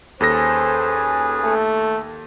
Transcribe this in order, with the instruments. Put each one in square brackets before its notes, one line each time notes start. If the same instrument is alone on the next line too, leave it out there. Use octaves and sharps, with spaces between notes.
[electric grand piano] D#2 A4 A#6 [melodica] C#4 G#4 B4 [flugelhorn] C5
[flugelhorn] A3